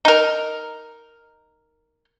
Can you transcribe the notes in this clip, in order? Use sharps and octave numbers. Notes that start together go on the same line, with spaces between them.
D#4 A#4